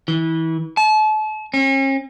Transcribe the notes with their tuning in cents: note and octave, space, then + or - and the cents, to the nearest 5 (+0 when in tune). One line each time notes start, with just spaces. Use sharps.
E3 -25
A5 -35
C#4 -45